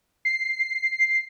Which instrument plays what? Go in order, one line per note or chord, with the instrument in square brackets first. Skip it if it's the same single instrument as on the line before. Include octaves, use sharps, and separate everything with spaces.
[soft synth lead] C7